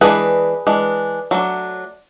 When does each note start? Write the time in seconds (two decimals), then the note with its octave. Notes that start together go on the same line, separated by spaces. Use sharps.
0.01 E3 G#3 D4 G#4 B4
0.67 E3 G#3 D4
1.31 F#3 A3 D4